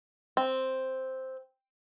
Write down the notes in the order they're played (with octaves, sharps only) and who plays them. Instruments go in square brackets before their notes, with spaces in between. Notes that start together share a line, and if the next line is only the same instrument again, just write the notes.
[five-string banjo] C4